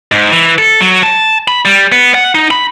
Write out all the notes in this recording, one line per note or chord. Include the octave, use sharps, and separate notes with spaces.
G#2
E3
A4
F#3
A5
B5
G3
B3
F#5
D#4
B5